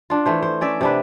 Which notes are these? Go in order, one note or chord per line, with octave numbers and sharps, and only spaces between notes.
D4 F4
E3 A3 C5
C5
C#4 D5 E5
C3 D4 B4